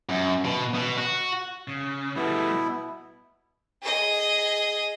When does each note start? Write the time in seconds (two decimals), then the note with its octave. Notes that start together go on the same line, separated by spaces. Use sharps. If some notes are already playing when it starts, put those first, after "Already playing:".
0.09 F#2
0.45 B2
0.75 B2
0.98 F#4
1.68 C#3
2.16 B2 G3 A3 B3 E4
3.82 G#4 D#5